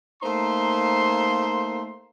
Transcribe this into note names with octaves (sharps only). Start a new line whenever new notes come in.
A3 A#3 D#4 C5 C6